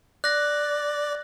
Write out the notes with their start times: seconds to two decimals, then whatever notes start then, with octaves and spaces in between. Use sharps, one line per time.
0.24 D5 F#6 A#6